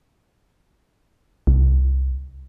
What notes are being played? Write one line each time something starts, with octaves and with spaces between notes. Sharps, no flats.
C2